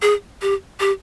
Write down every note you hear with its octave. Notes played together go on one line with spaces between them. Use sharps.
G#4
G4
G4